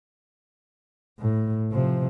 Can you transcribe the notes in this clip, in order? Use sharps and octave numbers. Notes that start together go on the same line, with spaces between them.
A2
C3 F3